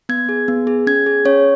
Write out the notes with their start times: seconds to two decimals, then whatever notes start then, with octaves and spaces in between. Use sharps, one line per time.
0.09 B3 G#6
0.29 G#4
0.48 B3
0.67 G#4
0.87 C#4 G#6
1.06 G#4
1.25 C#4 C#5